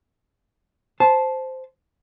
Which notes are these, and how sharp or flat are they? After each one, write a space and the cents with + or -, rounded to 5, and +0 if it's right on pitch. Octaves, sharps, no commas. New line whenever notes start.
C5 -5 A5 -15